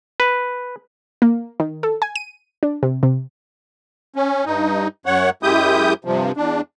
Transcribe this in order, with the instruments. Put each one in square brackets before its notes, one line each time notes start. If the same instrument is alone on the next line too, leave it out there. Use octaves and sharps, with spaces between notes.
[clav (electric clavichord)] B4
[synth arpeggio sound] A#3
D#3
A4
G#5
D#7
D4
C3
C3
[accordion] C#4
G2 D#4
F#2 C#5 F#5
F#2 G#3 E4 G4 D#6 G6
G2 C3 F3
E2 D4